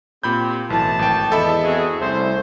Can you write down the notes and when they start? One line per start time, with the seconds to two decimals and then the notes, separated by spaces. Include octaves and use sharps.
0.23 A#2 C4 G4 B5 G6
0.70 B1 A2 E3 A5
0.99 G#1 G5
1.32 E2 A4 D#5 E5 B5
1.64 C4 F#4 G#4
2.00 C2 A3 C#4 C5